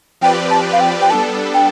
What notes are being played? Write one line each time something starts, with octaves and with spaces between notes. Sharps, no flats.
F3 C4 G4 B4 D5 G5
A5
F5
G5
G5
G3 B3 D4 A4 A5
G5